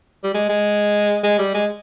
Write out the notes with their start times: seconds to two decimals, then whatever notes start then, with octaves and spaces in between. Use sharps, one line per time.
0.23 G3
0.34 G#3
0.49 G#3
1.24 G#3
1.39 G3
1.54 G#3